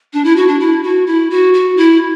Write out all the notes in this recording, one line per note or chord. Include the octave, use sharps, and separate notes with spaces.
D4
E4
F#4
D4
E4
F#4
E4
F#4
F#4
E4